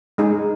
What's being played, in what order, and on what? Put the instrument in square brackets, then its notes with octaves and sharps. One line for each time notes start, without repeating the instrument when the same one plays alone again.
[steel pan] G#3 D#4 G#4